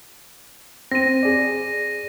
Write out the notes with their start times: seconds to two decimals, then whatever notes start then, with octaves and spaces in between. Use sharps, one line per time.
0.92 C4 A#6 D#7
1.23 G#4 D5